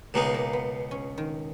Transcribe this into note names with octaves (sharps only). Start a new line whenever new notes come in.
C#2 B2 G#3 A#3 D#4
A#3
B3
C#4
D#3